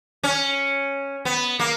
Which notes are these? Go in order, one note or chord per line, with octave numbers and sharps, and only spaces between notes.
C#4
B3
A#3